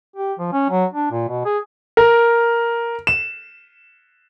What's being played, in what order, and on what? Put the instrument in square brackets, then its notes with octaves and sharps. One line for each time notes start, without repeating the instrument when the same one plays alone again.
[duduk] G4
F3
C#4
F#3
D4
A#2
B2
G#4
[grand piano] A#4
E7